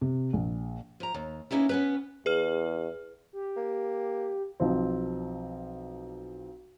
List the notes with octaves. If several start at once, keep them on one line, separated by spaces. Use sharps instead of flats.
C3
A#1
F3 A#5
D#2
A#3 B3 C#4 D#4 E4
B3 C#4 B4
E2 G#4 B4 F6
G4
A#3
B1 F3 C4